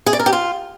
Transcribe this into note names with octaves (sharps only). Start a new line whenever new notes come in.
G#4
D5
A#4
G4
F4